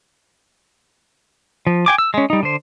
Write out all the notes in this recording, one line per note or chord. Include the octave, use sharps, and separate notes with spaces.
F3
G5 G#5 D6
E6
G#3 C#4
G3 D#4
D3 C5